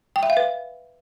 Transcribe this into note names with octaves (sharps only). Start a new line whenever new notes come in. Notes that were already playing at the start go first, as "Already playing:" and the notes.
G5
E5
F5
B4